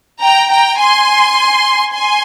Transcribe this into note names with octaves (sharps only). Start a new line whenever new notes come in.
G5 A#5
G5 A#5
G#5 C6
G#5 C6